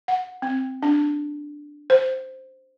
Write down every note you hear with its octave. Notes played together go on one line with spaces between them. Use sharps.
F#5
C4
D4
C5